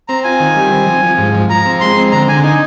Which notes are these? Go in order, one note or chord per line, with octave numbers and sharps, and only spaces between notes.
C4 A#5
F4 G#5
D#3
G3
C4
F3
F3
G#2
F3
F3 A#5
C4
G#3 C6
C4
D3 A#5
D3 G#5
D#4 G#5